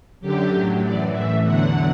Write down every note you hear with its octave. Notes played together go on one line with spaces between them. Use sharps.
F#2 D3 F#3 G4
A2 F#3
F#2 E3 D5
A2 E3 E5
E2 D3 F#3 F#5